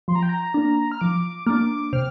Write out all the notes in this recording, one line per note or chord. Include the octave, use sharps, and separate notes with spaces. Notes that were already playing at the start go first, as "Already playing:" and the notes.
F3 C6
A#5
G5
A#5
A#3 D4
F6
F3 D6
A#3 D4 D6
C3 F6